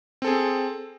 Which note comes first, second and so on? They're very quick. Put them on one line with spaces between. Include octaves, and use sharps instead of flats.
C4 A4 G#4